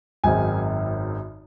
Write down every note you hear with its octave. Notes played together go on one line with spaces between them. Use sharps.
G#1 F#2 D#3 G#3 C4 G#5